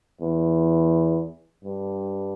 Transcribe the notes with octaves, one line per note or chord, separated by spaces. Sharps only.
E2
G2